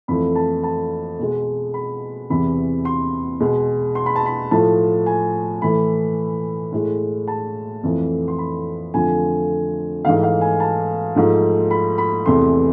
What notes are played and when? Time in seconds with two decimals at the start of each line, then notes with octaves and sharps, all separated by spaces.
0.08 F2 E3 A3 B5
0.35 A5
0.63 A5
1.19 B2 G#3
1.74 B5
2.30 E2 C3 E3 B5
2.85 C6
3.40 B2 G#3
3.95 C6
4.06 B5
4.16 A5
4.26 B5
4.51 A2 F3 A3 A5
5.06 G#5
5.62 A2 E3 A3 B5
6.72 A2 G#3
7.28 A5
7.83 F2 E3 A3
8.28 C6
8.38 B5
8.94 F2 D3 F3 A3 G#5
10.05 G#2 E3 A3 F5
10.23 F5
10.41 G#5
10.60 A5
11.15 G#2 F3 A3
11.71 B5
11.98 B5
12.26 E2 C3 E3 A3 C6